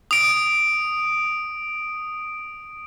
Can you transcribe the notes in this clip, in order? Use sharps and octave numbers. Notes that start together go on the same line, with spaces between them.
D#6 D7